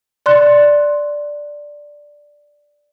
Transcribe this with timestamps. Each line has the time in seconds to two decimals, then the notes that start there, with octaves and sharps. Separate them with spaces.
0.26 D5 C6 F#6